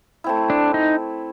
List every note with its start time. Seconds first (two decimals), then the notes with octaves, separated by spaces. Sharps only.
0.24 A3 C4 E4
0.50 D4
0.74 D#4